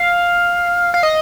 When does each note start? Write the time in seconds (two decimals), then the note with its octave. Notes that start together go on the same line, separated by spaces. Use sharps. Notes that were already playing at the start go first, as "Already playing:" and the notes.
Already playing: F5
0.94 F5
1.03 D#5